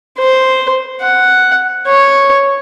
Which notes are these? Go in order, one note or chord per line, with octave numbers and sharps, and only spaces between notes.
C5
F#5
C#5